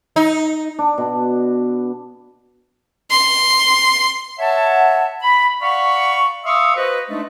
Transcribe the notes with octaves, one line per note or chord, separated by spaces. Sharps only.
D#4
D4
B2
C6
C#5 E5 F#5 A5
B5
D5 F5 F#5 B5 C#6
E5 F5 C6 C#6 D#6 E6
F#4 B4 C5 D#5
G#3 A3 D4 D#4